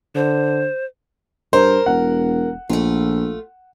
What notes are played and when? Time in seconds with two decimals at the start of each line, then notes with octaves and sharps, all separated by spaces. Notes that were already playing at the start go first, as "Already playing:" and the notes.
0.15 D3 C5
1.53 G2 A#4 C5
1.86 E1 F#5
2.69 A#1 A3 F4